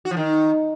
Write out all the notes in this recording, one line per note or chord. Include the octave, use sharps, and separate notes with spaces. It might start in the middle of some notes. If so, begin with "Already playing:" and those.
F#4
F3
D#3